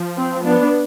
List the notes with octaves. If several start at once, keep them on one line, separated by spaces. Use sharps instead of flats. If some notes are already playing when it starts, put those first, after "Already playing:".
Already playing: F3
C4
B3 D4